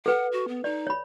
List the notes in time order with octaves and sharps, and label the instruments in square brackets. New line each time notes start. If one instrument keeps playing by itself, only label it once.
[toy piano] A4 B4 [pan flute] F#5
[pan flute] F#4
B3
[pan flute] D#4 [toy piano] D5
[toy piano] C#5 B5